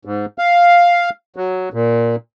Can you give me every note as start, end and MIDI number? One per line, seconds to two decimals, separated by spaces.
0.05 0.26 44
0.38 1.10 77
1.36 1.69 54
1.73 2.16 46